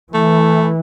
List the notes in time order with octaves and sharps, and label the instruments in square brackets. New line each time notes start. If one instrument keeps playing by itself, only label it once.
[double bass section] E3 [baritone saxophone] A3